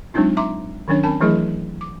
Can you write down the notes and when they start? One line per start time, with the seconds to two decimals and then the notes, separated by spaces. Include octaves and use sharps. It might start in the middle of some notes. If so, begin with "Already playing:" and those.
0.14 F#3 G#3 C4 D4 D#4 F4
0.37 E5 A#5 C6 D6
0.88 D#3 F#3 C#4 D4 C#5
1.04 C4 D4 A#4 G#5 A5 B5
1.21 E3 F#3 A3 E4 G#4 D#5
1.81 D6